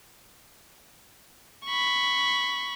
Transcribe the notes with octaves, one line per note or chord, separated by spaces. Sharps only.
B5 C#6